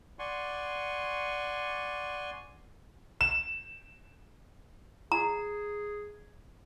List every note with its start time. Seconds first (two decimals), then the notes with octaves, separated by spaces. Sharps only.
0.19 D5 F#5 G#5 C6 C#6
3.21 E7
5.12 G#4 A#5